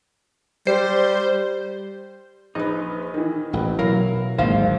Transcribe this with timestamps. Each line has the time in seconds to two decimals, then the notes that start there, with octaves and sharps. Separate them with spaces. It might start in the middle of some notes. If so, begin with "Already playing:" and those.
0.67 G3 C5
2.55 A#1 D#4 B4
3.14 D#3 E3
3.53 D#1 A1 A#2 B4
3.79 B2 F#3 E4 A#4 F5
4.38 G#1 D2 G#2 F#3 A#3 C5 F5